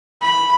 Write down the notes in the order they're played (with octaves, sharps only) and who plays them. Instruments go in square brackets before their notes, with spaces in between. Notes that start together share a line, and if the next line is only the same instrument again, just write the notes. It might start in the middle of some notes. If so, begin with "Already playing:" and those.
[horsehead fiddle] B5